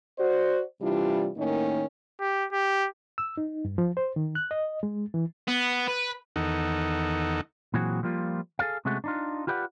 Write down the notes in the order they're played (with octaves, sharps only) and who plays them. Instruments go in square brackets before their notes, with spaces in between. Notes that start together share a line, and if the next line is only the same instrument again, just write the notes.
[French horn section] F#4 C5 D5
C3 E3 G3 D4 E4 F4
A2 D#3 A#3 C#4 D#4
[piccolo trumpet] G4
G4
[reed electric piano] E6
D#4
G2
F3
C5
D#3
F#6
D#5
G#3
E3
[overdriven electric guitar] B3
B4
[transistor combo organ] E2 D#3 D#4 A4 F#5
[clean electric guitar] A#2 E3 F#3 C4 F#4 G#4
F3 G3 A#3 F4
G#4 A4 D5 F5
C3 G#3 A3 C#4 F#4
D4 D#4 F4
F4 G4 B4 D5 D#5 F#5